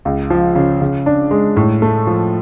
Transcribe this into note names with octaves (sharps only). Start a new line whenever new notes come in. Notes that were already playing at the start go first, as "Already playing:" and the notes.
C#2
F3
C#3
C#3
D4
G#3
A2
A3
F3